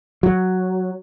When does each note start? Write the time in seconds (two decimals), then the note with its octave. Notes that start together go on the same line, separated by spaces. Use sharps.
0.23 F#3